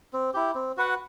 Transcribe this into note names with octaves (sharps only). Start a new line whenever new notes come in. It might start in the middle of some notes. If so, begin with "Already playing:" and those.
C4
E4 G4
C4
F#4 B4 F#5